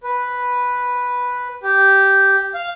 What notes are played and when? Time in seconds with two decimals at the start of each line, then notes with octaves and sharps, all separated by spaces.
0.03 B4
1.63 G4
2.54 F5